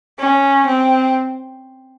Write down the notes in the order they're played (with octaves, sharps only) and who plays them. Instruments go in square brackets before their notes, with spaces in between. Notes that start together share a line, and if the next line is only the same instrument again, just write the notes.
[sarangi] C#4
C4